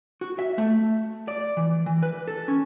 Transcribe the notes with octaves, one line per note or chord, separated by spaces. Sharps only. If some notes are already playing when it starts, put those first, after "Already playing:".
F#4
E5
A3
D5
E3
E3
B4
A4
C#4